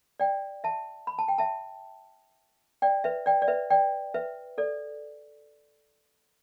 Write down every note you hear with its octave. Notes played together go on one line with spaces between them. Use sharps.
D5 G5
E5 A5
B5
A5
G5
E5 A5
D5 G5
B4 E5
D5 G5
D5
B4 E5
D5 G5
B4 E5
A4 D5